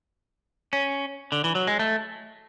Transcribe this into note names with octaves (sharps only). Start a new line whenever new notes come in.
C#4
D3
E3
F#3
G#3
A3